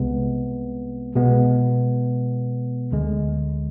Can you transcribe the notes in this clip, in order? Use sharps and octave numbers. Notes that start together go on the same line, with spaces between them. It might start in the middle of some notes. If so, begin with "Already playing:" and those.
Already playing: C2 C3 G#3 B3
B2 G#3 B3
D2 D3 G#3